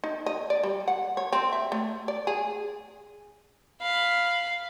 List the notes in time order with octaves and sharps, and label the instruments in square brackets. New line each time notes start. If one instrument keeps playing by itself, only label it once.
[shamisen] D#4
D#5
D5
G3
F#5
C#5
C4
E5
A3
D5
G#4
[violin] F5 B5